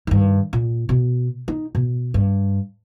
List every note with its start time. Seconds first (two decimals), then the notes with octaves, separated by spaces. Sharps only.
0.07 G2 D#3
0.53 A#2
0.89 B2
1.48 D#4
1.75 B2
2.14 G2